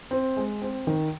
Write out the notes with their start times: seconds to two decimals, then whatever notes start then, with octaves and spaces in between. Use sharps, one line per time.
0.11 C4
0.37 G#3
0.61 C4
0.87 D#3